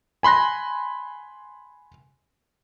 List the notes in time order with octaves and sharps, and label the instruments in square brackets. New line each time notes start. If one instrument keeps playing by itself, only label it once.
[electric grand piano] G#5 B5 C6 F#6 A#6